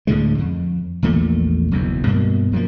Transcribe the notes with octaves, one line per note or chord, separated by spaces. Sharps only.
D2 A2 D3 G#3
F2
A#1 E2 A#2 A3
F#1 B1 E2
G2 B2 A#3
F#2 F3 A#3